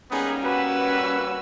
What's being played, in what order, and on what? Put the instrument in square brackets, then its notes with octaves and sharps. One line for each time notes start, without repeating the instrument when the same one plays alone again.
[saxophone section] G3 A#3 C#4 [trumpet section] B3 D#4 G#4
[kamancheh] F#4 E6 [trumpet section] B4